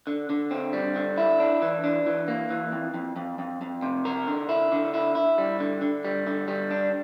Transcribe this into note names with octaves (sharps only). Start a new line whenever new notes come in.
D3
D3
C4
G3
D3
E4
D4
E3
D4
E3
A#3
E3
F2
F2
F2
F2
F2
C3
A#4
D3
E4
D3
E4
E4
G3
D3
D3
G3
D3
G3
D4